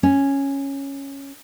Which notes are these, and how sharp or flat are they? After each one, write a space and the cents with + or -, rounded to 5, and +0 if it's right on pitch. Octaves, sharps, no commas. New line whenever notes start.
C#4 -5